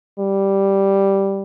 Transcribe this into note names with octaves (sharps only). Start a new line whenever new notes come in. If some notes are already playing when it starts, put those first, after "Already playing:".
G3